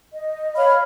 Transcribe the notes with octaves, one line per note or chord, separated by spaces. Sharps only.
D#5
C#5 F5 B5 F6